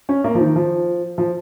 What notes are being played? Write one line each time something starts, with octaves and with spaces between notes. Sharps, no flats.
C#4
A#3
F3
D#3
F3
F3